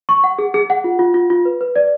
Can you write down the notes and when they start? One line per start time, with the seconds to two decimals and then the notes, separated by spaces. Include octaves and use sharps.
0.09 C#6
0.24 F#5
0.39 G#4
0.54 G#4
0.70 F#5
0.84 F4
0.99 F4
1.14 F4
1.30 F4
1.45 B4
1.61 B4
1.76 D5